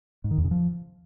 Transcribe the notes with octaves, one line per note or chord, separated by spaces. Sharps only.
G#2
D#3
E2
C#3
F3